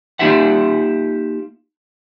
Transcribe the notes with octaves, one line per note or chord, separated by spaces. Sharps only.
A#3 D#4 F4 G4 E5 F#5